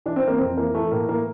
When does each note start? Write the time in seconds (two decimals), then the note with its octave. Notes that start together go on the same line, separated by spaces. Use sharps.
0.06 E3 D4
0.16 C4
0.23 E3 A#3
0.38 F2 C4
0.57 E3 A#3
0.74 E3 A3
0.91 A2 A#3
1.08 E3 A#3